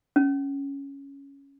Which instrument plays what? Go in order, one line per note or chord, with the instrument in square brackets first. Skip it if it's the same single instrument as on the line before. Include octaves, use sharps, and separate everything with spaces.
[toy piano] C#4